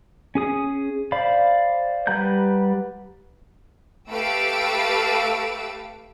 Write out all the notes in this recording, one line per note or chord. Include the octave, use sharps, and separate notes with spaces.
C#4 G#4 D#6
C5 D5 F5 B5
G3 B4 F#5 A#5 G6
A3 G4 B4 F5 E6 D7